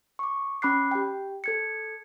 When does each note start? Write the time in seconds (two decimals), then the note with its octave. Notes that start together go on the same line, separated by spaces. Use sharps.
0.19 C#6 D6
0.62 C#4 B5 D6 F#6 C7
0.91 G4 G5
1.44 A4 G#6 C#7